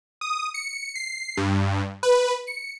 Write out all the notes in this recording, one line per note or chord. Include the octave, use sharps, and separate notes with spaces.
D#6
C#7
C7
G2
B4
C#7